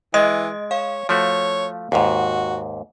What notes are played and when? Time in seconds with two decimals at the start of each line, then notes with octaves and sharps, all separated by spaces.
0.14 E3 G#3 D#5
0.71 C#5 F5
1.09 F3 A3 F#4 C#5
1.92 D#2 G#2 F#4